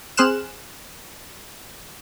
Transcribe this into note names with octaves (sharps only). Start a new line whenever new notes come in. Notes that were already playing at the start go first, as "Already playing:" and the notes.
C4 G#4 C5 F6 F#6 E7